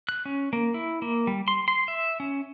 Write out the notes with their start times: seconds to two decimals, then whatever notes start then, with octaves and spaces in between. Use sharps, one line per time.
0.09 F#6
0.25 C#4
0.53 A#3
0.74 E4
1.02 A#3
1.27 G3
1.48 C6
1.68 C6
1.88 E5
2.20 C#4